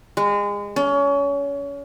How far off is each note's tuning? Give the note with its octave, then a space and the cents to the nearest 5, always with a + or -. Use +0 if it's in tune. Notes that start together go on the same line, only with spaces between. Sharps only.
G#3 -30
C#4 +30